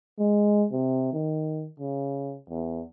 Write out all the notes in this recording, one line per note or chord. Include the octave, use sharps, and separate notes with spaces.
G#3
C3
D#3
C#3
E2